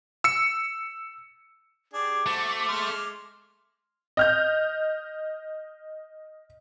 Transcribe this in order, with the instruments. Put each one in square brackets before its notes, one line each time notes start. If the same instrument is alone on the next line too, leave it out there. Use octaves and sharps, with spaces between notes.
[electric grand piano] E6 C#7
[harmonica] D4 G4 G#4 [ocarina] D6
[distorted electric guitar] A3 [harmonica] F#4 C5
[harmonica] G#3 C6 F6
[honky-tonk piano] D#5 F6 G6